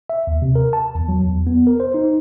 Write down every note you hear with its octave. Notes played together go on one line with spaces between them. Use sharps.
E5
D#2
C3
A#4
A5
E2
F#3
E2
B3
A#4
C5
D#4